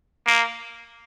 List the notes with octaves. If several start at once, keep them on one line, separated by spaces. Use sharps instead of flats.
A#3